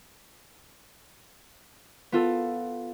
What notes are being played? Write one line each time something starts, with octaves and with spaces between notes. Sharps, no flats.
B3 F4 A4